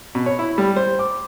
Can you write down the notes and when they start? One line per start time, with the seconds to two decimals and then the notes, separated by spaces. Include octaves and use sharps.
0.15 B2
0.26 C#5
0.39 E4
0.58 G3
0.76 C5
0.99 D6